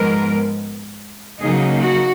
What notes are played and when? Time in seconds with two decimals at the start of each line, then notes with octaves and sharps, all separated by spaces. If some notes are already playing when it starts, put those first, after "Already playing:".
Already playing: G#2 F3 G#3 B3 A#4
1.40 C#3 F#3 A#3 D#4 G#4
1.81 F#4